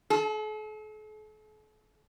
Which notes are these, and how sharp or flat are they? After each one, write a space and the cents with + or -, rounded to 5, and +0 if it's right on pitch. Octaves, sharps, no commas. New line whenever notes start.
A4 -45